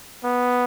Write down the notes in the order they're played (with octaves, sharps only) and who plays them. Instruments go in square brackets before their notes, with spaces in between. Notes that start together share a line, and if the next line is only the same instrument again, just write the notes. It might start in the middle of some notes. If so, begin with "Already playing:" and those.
[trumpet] B3